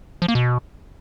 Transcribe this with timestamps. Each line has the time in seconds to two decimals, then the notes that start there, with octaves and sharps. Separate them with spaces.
0.22 F3
0.28 A#3
0.35 B2